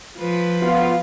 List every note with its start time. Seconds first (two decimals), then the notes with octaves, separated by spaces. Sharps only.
0.19 F3 B4
0.63 B3 F4